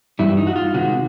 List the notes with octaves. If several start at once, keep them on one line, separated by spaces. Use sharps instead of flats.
G2 E3 G3 E4
D#4
F#4
F4
C3 D#3 G#3 F#4